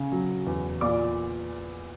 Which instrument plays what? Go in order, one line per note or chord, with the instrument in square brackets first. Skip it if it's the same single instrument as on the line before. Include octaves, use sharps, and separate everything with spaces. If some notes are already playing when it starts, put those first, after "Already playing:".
Already playing: [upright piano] C#3 C#4
F#3
E2
A#2 D5 D6